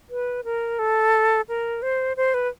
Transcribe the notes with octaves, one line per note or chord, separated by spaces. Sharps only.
B4
A#4
A4
A#4
C5
C5
B4